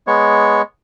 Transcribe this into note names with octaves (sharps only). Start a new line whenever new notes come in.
G#3 B3 C#5